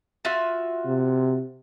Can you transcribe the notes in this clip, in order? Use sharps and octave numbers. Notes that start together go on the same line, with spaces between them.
F4 F#4 E5
C3